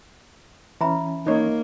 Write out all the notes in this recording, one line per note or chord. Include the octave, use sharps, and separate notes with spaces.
E3 C#4 E5 A#5 B5
A#3 D#4 C#5